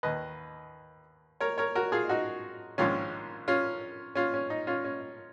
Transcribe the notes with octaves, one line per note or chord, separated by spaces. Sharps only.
D#2 D#3 B4 D#5
A#4 C#5
A#4 C#5
F#4 A#4
F4 G#4
D#4 F#4
A#1 G#2 D#3 C#4 F4
C#4 F4
C#4 F4
C#4
D#4
C#4 F4
C#4